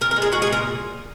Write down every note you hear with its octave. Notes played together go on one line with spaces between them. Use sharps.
A#2 A#4
A#4
G#3
G#4
A#2 F#4
G#4
A#2
A#4